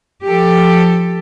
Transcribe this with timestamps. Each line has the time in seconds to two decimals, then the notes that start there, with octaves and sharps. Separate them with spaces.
0.24 F3 G4 A4